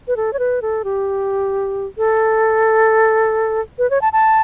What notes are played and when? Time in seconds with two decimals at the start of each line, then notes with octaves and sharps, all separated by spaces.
0.08 B4
0.17 A4
0.33 C#5
0.39 B4
0.62 A4
0.84 G4
1.98 A4
3.79 B4
3.91 C#5
4.02 A5
4.13 A5